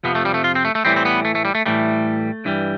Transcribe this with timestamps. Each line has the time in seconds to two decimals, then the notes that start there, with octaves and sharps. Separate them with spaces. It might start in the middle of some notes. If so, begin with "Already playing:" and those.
0.04 F2 C3 F3 B3
0.15 A3
0.25 G3
0.34 A3
0.44 F4
0.55 C4
0.65 A3
0.75 A3
0.85 A2 E3 G3 C4
0.96 C4
1.05 B3
1.25 A3
1.35 A3
1.45 G3
1.55 A3
1.66 A2 E3 G3 A3
2.45 G2 E3 G3